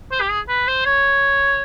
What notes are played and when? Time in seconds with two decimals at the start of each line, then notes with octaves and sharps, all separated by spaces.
0.11 C5
0.21 G4
0.30 G#4
0.49 B4
0.67 C5
0.85 C#5